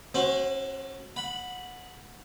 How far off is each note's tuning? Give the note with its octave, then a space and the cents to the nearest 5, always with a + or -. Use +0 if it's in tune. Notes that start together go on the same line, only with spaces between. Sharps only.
C#4 -40 F#4 +0 C5 +0
F#5 -20 B5 +0